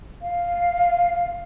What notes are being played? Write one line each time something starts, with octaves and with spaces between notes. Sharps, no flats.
F5